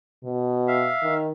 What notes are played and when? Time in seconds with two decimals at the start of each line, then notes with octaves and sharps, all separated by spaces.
0.24 B2
0.68 E5 F5
1.03 D#3